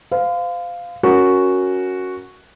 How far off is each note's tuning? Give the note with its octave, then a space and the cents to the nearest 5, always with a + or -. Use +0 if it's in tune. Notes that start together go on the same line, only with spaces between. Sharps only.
C5 -40 F5 +0
C#4 +0 F#4 +0 A#4 +0